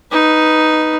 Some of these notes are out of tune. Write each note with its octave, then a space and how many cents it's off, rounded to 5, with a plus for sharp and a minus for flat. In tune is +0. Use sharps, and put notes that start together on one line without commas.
D#4 +0 B4 +0